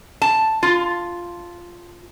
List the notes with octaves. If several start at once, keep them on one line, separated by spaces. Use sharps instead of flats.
A5
F4